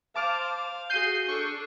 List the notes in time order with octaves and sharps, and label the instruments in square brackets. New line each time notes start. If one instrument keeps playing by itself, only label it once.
[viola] C5 [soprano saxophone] F5 [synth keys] A5 D6 F6
[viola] F#4 G#4 [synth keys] G6 C7 D#7
[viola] D4 A4 [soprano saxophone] C#6